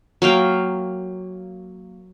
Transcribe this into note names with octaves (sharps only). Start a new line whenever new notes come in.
F#3 A#3 F5 G5